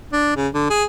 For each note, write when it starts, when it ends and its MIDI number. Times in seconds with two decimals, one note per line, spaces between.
0.13 0.33 62
0.37 0.48 49
0.54 0.66 50
0.70 0.84 68